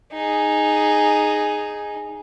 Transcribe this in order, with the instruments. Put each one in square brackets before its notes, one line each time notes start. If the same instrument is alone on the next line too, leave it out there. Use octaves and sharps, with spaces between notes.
[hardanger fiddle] D#4 G#4